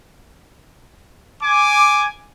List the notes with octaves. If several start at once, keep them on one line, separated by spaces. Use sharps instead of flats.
G#5 D6